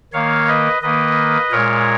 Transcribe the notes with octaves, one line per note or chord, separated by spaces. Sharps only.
D#3 A#3 C#5 F5
B4 D#5
D#3 A#3 B4 D#5
A#2 G#3 A#4 C#5